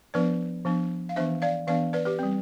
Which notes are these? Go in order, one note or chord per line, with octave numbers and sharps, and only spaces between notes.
F3 B3 D4 B4 D5
F3 B3 D4
F5
E3 B3 D4 C5 E5
D5 F5
E3 B3 D4 D5 F5
B4 D5
G4 B4
G3 C4